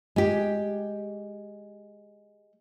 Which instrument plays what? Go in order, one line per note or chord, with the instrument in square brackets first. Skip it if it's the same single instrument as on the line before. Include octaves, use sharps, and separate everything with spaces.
[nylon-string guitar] G#3 G4